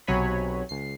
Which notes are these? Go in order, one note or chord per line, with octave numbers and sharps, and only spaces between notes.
B1 C3 F#3 C#5 G#5 B5
C#2 C7